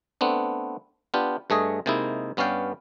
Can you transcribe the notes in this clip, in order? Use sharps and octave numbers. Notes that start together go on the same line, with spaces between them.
A3 B3 C4 D4
B3 D4 F4 G4
G2 A3 G#4 D#5
C3 G#3 A#3 D#4 E4
G2 B3 C#4 D5 F5 G5